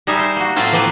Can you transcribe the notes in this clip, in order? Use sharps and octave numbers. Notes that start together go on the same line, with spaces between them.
G3 D#4 G#4 A#4 E5
C5
A#3 F#4
A2 F#3 C4 E4 F4 A5
E3 F3 A#3 C4 B4